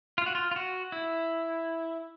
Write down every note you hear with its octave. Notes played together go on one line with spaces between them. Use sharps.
F4
F#4
F4
F4
F#4
E4